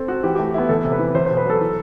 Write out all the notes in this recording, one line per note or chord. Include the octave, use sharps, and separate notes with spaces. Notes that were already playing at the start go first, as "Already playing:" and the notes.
Already playing: C4 A4
F#4
E3 G4
G4
A3
B3 E4
E2 A4
C3
B4
E3
E2 C5
C5
B2
B4
F#3 A4
E3